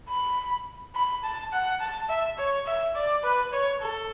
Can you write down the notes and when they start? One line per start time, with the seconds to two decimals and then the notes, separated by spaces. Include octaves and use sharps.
0.09 B5
0.95 B5
1.24 A5
1.53 F#5
1.81 A5
2.09 E5
2.38 C#5
2.66 E5
2.95 D5
3.23 B4
3.53 C#5
3.81 A4